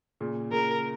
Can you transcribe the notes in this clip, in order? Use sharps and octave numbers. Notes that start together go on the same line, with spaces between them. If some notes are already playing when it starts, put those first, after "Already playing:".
A#2 C#3
A#2 C#3 A#4